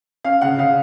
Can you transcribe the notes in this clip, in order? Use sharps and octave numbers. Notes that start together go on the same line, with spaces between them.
C#4 F5
C#3 F#5
C#3 F5